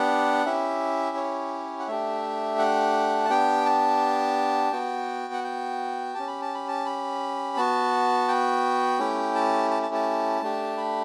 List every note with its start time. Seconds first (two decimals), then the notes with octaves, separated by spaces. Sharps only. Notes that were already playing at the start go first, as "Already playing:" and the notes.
Already playing: B3 D4 G4 F#5
0.46 C#4 E4 G4 E5
1.17 C#5
1.80 F#5
1.87 A3 D4 G4 E5
2.59 F#5
3.25 A5
3.30 B3 D4 G4 G5
3.66 A5
4.72 B3 F#4 G5
5.33 F#5
5.44 G5
6.15 C#4 G4 A5
6.28 B5
6.42 A5
6.55 B5
6.68 A5
6.86 B5
7.57 B3 F#4 A5
8.28 G5
8.99 A3 C#4 E4 G4
9.35 A5
9.71 A5
9.83 A5
9.94 A5
10.42 A3 D4 G4
10.77 B5